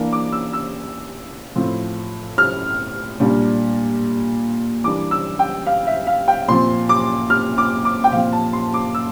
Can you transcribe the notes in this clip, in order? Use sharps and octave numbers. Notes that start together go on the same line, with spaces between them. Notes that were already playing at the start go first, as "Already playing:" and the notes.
Already playing: E3 A#3 D4
D6
E6
E6
A2 F3 C4
F6
A#2 G3 D4
E3 G3 A#3 D4 D6
E6
G5
F5
E5
F5
G5
A#2 F3 C4 C6
D6
F6
D6
D6
G5
A#2 F3 C4 F5
A5
C6
D6
E6